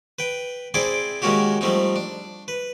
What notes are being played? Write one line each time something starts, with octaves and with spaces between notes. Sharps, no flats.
B4 G5
C4 E4 G#4 C5 D5 G5
D#3 G#3 A#3 C#4 F#4 G4
F3 G3 A3 C4 D#4
D4
B4